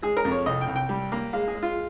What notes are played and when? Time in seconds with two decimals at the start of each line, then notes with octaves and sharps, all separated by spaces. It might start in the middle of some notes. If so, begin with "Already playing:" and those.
0.02 G#3 G#4
0.17 A#4
0.25 F2
0.31 C#5
0.46 C2 D#5
0.61 G5
0.67 C2
0.76 G5
0.89 G3
1.12 A#3
1.33 G#3 F5
1.48 G#4
1.55 G#3
1.62 F4